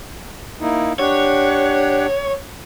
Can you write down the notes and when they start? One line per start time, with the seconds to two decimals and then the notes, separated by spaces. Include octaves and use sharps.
0.61 A#3 D#4 E4
0.99 D4 G4 C#5 F#5